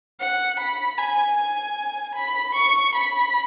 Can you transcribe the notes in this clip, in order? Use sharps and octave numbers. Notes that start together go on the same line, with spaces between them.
F#5
B5
G#5
G#5
B5
C#6
B5